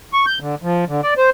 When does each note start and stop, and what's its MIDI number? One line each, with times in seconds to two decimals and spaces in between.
0.13 0.26 85
0.26 0.39 91
0.41 0.55 50
0.63 0.85 53
0.88 1.01 50
1.03 1.14 74
1.17 1.30 72